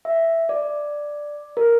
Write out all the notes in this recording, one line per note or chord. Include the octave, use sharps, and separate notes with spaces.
E5
D5
A#4